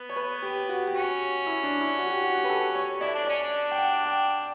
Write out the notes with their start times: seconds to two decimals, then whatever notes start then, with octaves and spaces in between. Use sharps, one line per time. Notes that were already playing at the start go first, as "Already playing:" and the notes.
Already playing: B3
0.10 C#5
0.16 B4
0.42 G4
0.69 F#4
0.87 G4
0.94 C#4 F#4
1.46 E4
1.63 D4
1.81 E4
1.99 F#4
2.06 G4
2.10 F#4
2.24 F#4
2.37 G4
2.44 B4
2.49 A4
2.75 C#5
3.01 E4 D5
3.15 D4
3.27 C#4 D5
3.43 D4
3.71 G5
3.79 F#5
4.05 G5